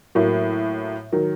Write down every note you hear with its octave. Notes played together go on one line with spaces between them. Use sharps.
A2 F#3 A#3
D#3 F#3